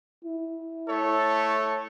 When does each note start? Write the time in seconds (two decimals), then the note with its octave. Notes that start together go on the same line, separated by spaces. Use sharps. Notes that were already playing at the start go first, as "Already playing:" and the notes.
0.25 E4
0.89 A3 A4 C#5